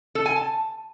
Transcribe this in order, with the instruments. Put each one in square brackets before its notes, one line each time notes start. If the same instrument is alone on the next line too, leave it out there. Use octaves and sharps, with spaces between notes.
[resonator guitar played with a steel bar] A4
G#5
A5